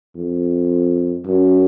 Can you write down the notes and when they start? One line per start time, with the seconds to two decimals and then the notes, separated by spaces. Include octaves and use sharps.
0.16 F2
1.26 F#2